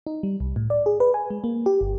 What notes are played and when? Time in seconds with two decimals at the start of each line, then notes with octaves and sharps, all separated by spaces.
0.07 D#4
0.23 G3
0.40 C2
0.56 A2
0.70 D5
0.86 G#4
1.00 B4
1.14 G#5
1.30 G#3
1.44 A#3
1.66 G4
1.81 G1